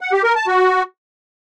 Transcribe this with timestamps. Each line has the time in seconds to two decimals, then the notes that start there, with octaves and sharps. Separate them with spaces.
0.01 F#5
0.12 G4
0.24 A#4
0.35 A5
0.47 F#4